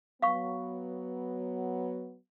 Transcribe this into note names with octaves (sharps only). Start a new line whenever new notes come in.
F#3 B3 F5 C#6